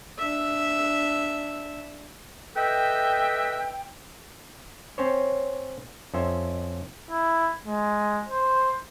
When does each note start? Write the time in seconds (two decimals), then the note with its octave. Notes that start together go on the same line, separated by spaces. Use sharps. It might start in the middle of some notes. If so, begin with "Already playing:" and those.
0.18 D4 E5
2.56 A4 B4 D#5 E5 G5
4.98 C4 C#4 C5 C#5
6.14 F2 C#4 C5 E5
7.11 E4
7.66 G#3
8.28 C5